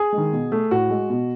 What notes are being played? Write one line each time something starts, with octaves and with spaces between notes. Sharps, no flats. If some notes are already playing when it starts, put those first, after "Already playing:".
Already playing: G#4
G#3
D#3
B2
A3
A2 F#4
G#3
B2